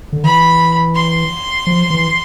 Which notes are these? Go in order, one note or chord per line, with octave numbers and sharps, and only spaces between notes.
D3
E3 B5
C6
F3
E3